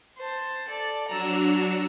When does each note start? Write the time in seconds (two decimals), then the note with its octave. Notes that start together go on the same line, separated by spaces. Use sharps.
0.18 C5 A5
0.68 A4 D5
1.09 F#3 D4 F#4 A#5 E6